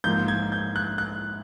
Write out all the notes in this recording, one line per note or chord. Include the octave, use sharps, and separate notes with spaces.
G#2 F3 A#3 G6
G#6
G6
F#6
F#6